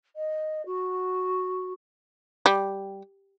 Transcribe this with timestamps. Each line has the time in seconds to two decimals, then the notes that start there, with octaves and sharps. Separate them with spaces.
0.16 D#5
0.66 F#4
2.46 G3